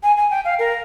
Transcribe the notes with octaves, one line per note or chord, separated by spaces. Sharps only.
G#5
G#5
G5
F5
A#4